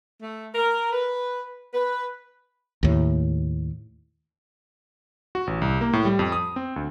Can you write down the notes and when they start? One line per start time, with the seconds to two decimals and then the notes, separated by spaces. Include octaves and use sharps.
0.22 A3
0.55 A#4
0.93 B4
1.74 B4
2.83 D#2 A2
5.35 F#4
5.47 A1
5.62 C2
5.81 A#3
5.93 A2
6.05 G3
6.19 F2
6.32 D#6
6.56 C4
6.76 D2